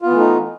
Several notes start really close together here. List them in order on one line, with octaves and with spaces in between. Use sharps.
F4 B3 E3 A3 D#4